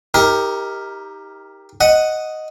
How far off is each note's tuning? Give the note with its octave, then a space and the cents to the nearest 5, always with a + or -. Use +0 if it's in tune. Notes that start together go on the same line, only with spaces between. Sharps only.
D#4 +35 G4 +10 A#4 +0
D#5 +0 F#5 +0